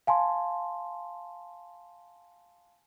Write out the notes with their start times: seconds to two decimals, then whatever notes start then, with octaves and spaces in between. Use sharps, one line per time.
0.07 F5 G#5 A5 C6